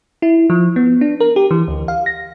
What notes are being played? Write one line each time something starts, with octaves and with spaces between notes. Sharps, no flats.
E4
F3
B3
D4
A#4
G4
E3
D2
F5
A#6